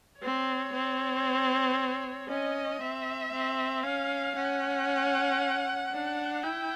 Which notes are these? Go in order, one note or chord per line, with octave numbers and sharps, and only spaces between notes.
C4 C#5
C4
C#4 D#5
C4 E5
C4
C#4 F5
C#4 F#5
D4
E4 G5